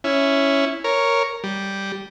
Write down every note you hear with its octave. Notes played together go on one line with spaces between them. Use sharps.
C#4 E4
A#4 C#5
G3